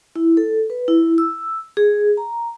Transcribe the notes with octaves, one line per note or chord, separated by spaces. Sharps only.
E4
A4
B4
E4
E6
G#4
A#5